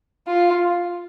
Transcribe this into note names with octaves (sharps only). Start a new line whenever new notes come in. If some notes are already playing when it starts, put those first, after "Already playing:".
F4